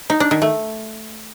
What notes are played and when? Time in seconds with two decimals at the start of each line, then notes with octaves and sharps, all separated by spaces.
0.10 D#4
0.20 D4
0.31 D#3
0.42 A3